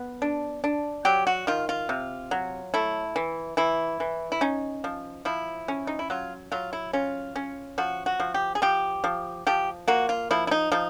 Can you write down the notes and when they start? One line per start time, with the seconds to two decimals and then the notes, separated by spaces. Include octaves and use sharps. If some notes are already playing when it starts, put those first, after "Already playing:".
Already playing: B3
0.22 D4
0.64 D4
1.05 F#3 G4
1.27 F#4
1.47 D#3 F4
1.69 F4
1.89 C3
2.31 F#3
2.74 A3 E4
3.16 E3
3.57 E3 E4
4.00 E3
4.32 E4
4.41 C#4 D#4
4.84 F3
5.25 F3 E4
5.68 C#4
5.87 D#4
5.99 E4
6.10 F#3 F4
6.52 F#3 F4
6.73 E4
6.93 C#4 F4
7.36 C#4
7.78 F3 F#4
8.06 F#4
8.20 F3
8.34 G4
8.55 G#4
8.62 F3 G4
9.04 F3
9.47 F3 G4
9.88 A#3 F#4
10.09 F4
10.31 F3 E4
10.47 E4
10.51 D#4
10.72 F3 D#4